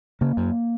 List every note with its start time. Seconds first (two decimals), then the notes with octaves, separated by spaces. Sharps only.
0.21 C#3 A#3
0.37 F#2